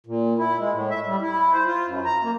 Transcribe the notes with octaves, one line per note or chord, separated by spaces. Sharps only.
A#2
E4
G#3
A2
E5
G3
E4
C5
F4
F#2
A#5
A#3